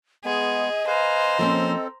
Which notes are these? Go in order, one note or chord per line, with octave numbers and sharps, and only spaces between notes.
G#3 B3 G#4 D#5
B4 C5 F5 G#5 A#5
F3 A#3 C4 C#4 A4